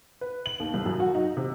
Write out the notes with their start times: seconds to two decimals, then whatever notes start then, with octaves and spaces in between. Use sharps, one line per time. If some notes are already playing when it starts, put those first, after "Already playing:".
0.21 B4
0.46 F#7
0.60 D#2
0.74 C2
0.86 F#2
1.00 F#4
1.15 D#4
1.37 C3